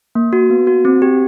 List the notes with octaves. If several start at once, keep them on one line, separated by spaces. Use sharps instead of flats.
A#3
F#4
B3
F#4
C4
G4